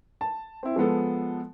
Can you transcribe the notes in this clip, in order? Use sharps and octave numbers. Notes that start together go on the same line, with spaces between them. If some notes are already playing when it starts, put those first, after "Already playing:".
A5
C4 E4
F3 G#3 B3 A4